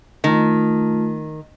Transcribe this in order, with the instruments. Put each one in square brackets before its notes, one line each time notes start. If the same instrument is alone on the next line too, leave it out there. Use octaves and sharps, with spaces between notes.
[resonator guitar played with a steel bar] D#3 [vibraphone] A3 F4